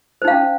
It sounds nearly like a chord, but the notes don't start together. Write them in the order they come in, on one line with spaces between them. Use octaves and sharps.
C5 D#4 F5 C#4